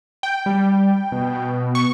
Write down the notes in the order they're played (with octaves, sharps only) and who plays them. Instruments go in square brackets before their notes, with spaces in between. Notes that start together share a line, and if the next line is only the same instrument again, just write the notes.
[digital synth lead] G5
[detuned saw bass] G3
B2
[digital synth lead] C#6